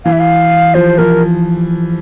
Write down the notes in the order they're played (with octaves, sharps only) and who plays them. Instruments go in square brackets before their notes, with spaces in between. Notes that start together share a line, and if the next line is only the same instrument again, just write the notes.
[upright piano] E3 [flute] F5
[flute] E5
F5
[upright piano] F3 [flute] C5
[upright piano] F3 [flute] A#4